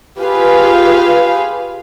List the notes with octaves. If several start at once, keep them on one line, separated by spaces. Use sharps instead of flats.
F4 G4 G#4 B4 F5